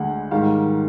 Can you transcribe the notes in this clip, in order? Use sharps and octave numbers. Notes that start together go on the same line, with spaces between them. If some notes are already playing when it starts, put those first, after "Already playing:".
Already playing: D2 D3 G#3 F#5
G#2 D#3 G3 F5